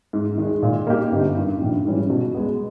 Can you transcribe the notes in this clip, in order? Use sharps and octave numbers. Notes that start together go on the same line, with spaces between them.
G#2
D#3 G#3
A#2
A#3 D#4 G4
G1
G2 D#3
A#1
G#2 E3 G3 C#4
B2
G#3 B3